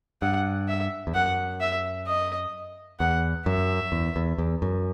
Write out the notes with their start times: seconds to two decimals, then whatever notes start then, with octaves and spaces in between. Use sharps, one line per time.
0.22 G2 F#5
0.68 E5
1.07 E2
1.14 F#2 F#5
1.61 E5
2.07 D#5
3.00 E2 F#5
3.46 F#2 E5
3.92 E2
4.16 E2
4.38 E2
4.62 F#2